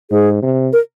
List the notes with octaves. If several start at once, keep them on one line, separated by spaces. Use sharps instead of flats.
G#2 G#4
C3
A#4